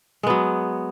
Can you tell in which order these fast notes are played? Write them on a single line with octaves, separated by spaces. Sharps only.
G#3 B3 F#3